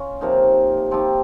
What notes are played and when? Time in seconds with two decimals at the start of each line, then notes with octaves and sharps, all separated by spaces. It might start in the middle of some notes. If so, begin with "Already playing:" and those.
Already playing: C#4 F4
0.21 C3 F3 A#3 D#4
0.91 F3 C4 D#4 G4